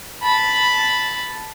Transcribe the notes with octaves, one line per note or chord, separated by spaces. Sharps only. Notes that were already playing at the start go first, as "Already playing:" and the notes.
A5 B5